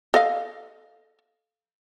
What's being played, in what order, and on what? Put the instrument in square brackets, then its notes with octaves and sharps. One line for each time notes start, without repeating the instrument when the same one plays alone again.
[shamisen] A4 D#5 F5